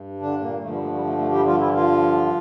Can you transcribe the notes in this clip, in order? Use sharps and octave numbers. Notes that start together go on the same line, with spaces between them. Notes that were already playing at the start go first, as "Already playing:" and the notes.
Already playing: G2
D3 D4
A#2 A#3
G2 D3 F3 A3
G3
A3
G3
A3
A3
G3 G4
F3 F4
E3 E4
F3 F4